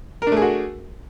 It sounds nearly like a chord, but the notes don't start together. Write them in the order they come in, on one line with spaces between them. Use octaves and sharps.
A#4 D4 A3 G#4 F#4